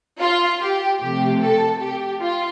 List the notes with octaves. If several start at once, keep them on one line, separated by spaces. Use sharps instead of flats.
F4
G4
C3 F3 A3 G4
A4
G4
F4